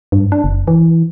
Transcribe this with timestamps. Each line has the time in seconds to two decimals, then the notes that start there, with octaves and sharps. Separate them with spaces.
0.12 G2
0.32 D4
0.44 F#1
0.68 E3